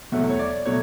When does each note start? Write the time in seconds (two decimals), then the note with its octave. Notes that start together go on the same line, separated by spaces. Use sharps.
0.12 E2 B2 F#3 A3 E5
0.30 C#5
0.39 D5
0.66 B2 F#3 A3 C#5